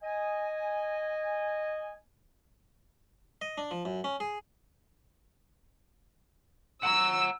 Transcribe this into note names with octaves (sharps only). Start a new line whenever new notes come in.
D#5 G#5
D#5
D4
F3
F#2
C#4
G#4
F#5 A5 A#5 E6